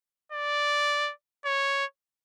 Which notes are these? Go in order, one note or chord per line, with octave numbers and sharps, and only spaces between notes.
D5
C#5